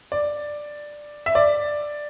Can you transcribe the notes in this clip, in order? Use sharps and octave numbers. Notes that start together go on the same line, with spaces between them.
D5
E5
D5